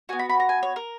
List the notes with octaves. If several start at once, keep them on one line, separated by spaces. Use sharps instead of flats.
B3 F#4 G#5
B5
B5
A#5
G#5
C#5
A#4